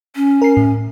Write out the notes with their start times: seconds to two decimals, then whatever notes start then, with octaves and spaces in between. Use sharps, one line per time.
0.16 C#4
0.42 A#4 C7
0.57 A2